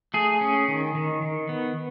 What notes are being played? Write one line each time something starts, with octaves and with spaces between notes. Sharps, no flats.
A3 G#4
C#4
D#3
D#3
D#3
B3